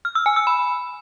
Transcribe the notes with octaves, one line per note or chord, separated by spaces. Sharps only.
F6
E6
G#5
E6
B5